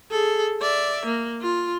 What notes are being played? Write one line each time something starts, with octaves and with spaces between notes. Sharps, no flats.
G#4 A4
D5 E5
A#3
F4